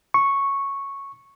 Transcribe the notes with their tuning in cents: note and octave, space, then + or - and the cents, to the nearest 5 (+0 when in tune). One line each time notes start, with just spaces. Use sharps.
C#6 -5